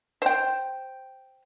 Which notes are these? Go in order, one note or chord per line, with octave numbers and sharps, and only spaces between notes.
C5 G5